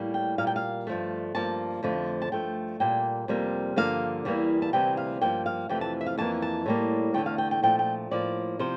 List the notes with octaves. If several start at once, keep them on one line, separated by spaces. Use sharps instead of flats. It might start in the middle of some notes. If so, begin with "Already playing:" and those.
Already playing: A2 G3 A#3
G5
A#2 G3 A#3 F5
G5
F5
G2 F3 A3
G2 F3 A#3 A5
F2 D3 F3 A3
A5
G2 F3 A3 G5
A#2 G3 A#3 G5
F2 C3 G3 A#3
G2 D3 F3 A#3 F5
E2 E3 G3 A#3
A5
D2 C3 E3 G3 A#3 G5
F5
G2 F3 A#3 G5
F5
F2 C3 E3 A3 G5
A5
E5
F5
F2 E3 A#3 A5
A5
A2 G3 A#3
E2 D3 F3 A3 G5
F5
G5
G5
A#2 F3 A3 G5
G5
A2 F3 A#3 D5
C3 F3 C5